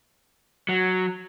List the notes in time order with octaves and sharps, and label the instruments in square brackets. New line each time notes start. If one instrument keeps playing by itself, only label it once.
[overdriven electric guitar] F#3